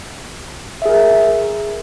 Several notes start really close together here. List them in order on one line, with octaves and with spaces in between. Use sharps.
E5 G#4 A#4